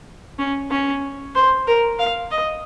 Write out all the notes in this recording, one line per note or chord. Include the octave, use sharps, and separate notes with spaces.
C#4
C#4
C5
A#4
F5
D#5